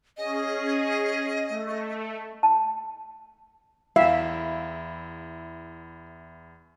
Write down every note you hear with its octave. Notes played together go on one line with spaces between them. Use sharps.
C#4 G#4 D#5
A3
A5
E2 E4 E5 F5